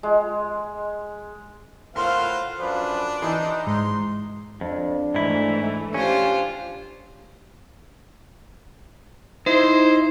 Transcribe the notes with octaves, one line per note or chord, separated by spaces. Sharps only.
G#3
A2 F4 A#4 C5 F5 F#5 C6
F#2 F3 D4 B4
E3 D#4 C6
G#2 C6
F2 D4
G#2 E3 A3 E4
C#4 D4 F4 G4 C5
D#4 E4 C5